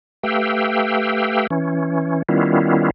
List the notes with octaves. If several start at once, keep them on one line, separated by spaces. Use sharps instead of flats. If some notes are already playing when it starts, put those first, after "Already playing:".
A3 G4 B4 F5 G5 E6
E3 C#4
D#3 G3 B3 C#4 E4 F4